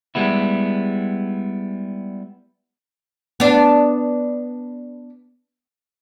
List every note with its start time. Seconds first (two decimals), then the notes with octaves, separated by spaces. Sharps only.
0.15 G3 G#3 B3 E4
3.40 B3 D4